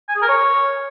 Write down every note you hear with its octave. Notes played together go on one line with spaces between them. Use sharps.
G#5
G#4
A#4
C#5